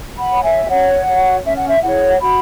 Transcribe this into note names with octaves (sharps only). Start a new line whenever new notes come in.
F#5 B5
C#5
E5 G#5
C#4 C#5 F#5
F#4 C#5
C#4 E5
F#5
E5
E4 G#4 C#5 F#5
F#4 F#5 B5